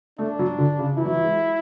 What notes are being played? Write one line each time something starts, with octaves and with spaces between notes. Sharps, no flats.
A3 D4
F#3
D3
C#3
E3 E4
F#3
E3
G#3